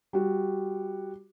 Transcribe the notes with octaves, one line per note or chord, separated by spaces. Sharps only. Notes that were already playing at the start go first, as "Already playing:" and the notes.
G3 F#4